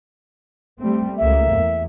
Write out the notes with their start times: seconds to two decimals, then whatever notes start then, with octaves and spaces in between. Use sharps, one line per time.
0.80 G3 A3 C4
1.18 C#2 A3 A#3 E5
1.51 E2